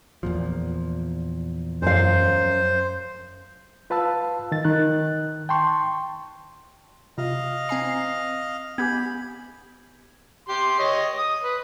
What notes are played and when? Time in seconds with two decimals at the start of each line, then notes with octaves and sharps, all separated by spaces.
0.23 E2 A#2 F3
1.82 F#2 C5 F5
3.90 F4 B4 F5 A5 E6
4.52 D#3 A6
4.65 D#3 F#6
5.49 G5 A5 C6 C#6
7.18 C3 F4 D#5 F5
7.69 C4 G#5 A#5 C7
8.78 B3 G4 G#5 B5 G6 G#6
10.49 G4 C6
10.79 C#5 D#5
11.18 D#6
11.43 B4